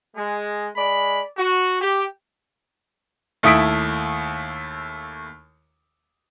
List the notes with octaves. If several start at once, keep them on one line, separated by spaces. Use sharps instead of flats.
G#3
G#3 D5 B5
F#4
G4
D#2 A3 E4 D#6 B6 D7